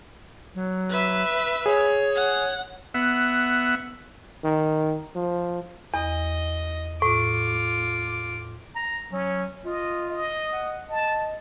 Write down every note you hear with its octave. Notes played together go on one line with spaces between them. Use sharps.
F#3
B4 E5
G#4 C#5
F#5
B3 E5 F#5
D#3
F3
E2 D#5
A2 F4 D6
A#5
F#3 C#4
F4 D#5
D#5
F#5
D#5 A5